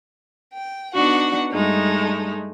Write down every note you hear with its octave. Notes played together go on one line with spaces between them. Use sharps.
G5
B3 D4 D#4 F#4 F#5
G2 G#3 A3 D#4